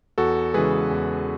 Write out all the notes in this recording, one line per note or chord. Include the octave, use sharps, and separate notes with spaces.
E2 F#4 A4
C#3 E3 G#3 G#4 B4
E2